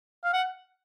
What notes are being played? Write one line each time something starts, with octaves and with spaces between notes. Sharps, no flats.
F5
F#5